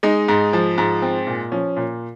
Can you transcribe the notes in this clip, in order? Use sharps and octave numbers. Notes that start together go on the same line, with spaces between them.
G#3 D#4
G#2
F3
G#2
C4
A#2
F3 C#4
A#2